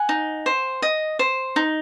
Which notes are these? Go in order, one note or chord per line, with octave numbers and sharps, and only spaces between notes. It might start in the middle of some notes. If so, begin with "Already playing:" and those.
Already playing: F#5 G#5
D#4
C5
D#5
C5
D#4